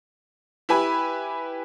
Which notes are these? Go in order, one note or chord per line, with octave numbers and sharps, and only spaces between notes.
E4 G4 B4 G#5 B5